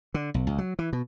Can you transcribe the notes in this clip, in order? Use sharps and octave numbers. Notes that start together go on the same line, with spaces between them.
D3
B1
C#2
F#3
E3
B2